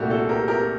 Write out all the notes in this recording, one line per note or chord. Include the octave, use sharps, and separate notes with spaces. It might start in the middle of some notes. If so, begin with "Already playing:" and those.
Already playing: C2 A#2 A3 F#4 G4
F#4 A4
G4 A#4
G4 A#4